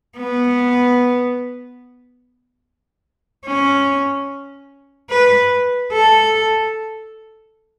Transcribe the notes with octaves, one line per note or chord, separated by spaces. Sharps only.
B3
C#4
B4
A4